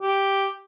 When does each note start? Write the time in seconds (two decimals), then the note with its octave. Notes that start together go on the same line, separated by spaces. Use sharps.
0.02 G4